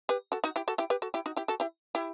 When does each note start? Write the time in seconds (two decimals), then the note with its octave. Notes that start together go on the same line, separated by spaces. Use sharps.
0.09 G4 B4
0.32 F#4 A4
0.44 D#4 F#4
0.56 E4 G4
0.68 F#4 A4
0.78 E4 G4
0.90 G4 B4
1.02 F#4 A4
1.14 E4 G4
1.26 D#4 F#4
1.36 E4 G4
1.48 F#4 A4
1.60 E4 G4
1.95 E4 G4